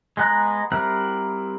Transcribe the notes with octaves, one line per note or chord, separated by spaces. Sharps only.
G#3 B3 F#5 A#5 F#6
G3 C4 E4 A#4 F#5